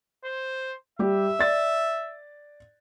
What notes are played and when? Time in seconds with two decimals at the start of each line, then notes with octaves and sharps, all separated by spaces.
0.25 C5
0.99 G3 G4 E5
1.39 D5 A6